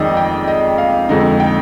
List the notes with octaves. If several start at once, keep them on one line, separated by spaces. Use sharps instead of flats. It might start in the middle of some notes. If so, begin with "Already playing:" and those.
Already playing: F2 D#3 G#3 D#4 D5 D#5
G5
D#5
F5
F2 D3 G#3 D#4
G5